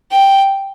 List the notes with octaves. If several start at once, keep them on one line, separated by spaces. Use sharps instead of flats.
G5